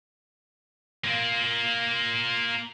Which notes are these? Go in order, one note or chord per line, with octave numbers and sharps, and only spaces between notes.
A#3 F4